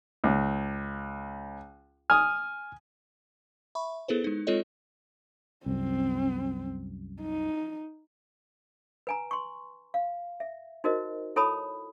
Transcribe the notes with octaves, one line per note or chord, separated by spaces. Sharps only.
C#2
G#5 D#6 F6
E5 B5 C#6
B3 E4 G#4 A4 B4 C5
G#3 D#4
G#3 C4 F4 A4 C#5 D#5
C2 F#2 C4
D#4
B4 G#5 A#5
C6 C#6
F5
E5
D#4 F#4 A#4 C5 D#5
E4 A4 C#5 A5 B5 D#6